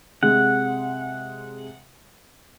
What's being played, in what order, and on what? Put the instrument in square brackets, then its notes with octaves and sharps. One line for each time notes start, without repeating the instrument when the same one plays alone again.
[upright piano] C3 G#3 G#4 [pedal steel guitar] F#5